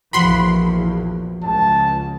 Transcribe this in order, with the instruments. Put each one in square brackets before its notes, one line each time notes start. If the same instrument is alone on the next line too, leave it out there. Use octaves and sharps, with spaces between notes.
[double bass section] A#1 E2 [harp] F3 F#4 D7 [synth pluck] B5 C6
[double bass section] C#2 [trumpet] A5